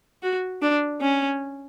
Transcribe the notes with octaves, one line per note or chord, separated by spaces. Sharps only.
F#4
D4
C#4